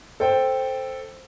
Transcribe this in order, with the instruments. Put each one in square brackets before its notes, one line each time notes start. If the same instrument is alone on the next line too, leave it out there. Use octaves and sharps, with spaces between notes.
[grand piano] A4 C5 G5